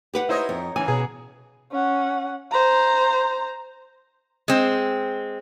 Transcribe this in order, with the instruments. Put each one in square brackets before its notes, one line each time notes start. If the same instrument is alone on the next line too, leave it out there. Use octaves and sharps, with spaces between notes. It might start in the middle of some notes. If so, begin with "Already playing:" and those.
[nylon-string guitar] G4 B4 F#5
[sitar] D#4 C#5 D#5 [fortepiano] E4 C5
[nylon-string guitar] F2
[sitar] C#3 A#3 [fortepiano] E3 [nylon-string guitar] G#5
[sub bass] B2 [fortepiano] B3 G#4
[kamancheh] C#4 F#5
C5 A#5
[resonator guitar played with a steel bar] G#3 C4